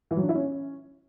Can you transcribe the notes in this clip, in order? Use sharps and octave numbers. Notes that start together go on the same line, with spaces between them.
E3
F#3
D4
E4
C#4